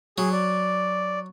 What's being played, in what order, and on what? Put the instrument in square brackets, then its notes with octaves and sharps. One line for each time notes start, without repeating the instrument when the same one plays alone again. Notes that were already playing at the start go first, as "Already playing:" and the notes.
[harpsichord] F#3 [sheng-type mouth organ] G#4
[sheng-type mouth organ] D5